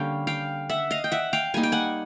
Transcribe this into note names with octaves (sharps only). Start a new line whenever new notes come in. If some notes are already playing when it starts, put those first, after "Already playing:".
Already playing: D3 G3 A#3 C#4 F5 G5
F5 G5
E5 F#5
D#5 F5
G5
E5 F#5
F5 G5
G3 A#3 D#4 G#5
G5
F#5 G#5